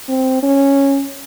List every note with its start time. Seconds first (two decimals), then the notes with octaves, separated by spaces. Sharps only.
0.09 C4
0.43 C#4